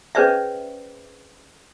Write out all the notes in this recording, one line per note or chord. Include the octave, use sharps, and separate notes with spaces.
C#4 G#4 B4 C5 D5 E5